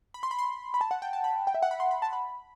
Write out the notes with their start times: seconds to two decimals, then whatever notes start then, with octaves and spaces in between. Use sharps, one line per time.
0.14 B5
0.23 C6
0.31 B5
0.39 C6
0.74 B5
0.81 A5
0.91 F#5
1.02 G5
1.13 A5
1.24 B5
1.47 G5
1.54 E5
1.62 F#5
1.71 B5
1.80 C6
1.91 B5
2.02 A5
2.13 B5